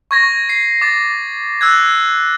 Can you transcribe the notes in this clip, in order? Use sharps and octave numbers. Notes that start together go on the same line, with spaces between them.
C#6 G#6 A#6
C7
D6 A6
E6 F#6 G#6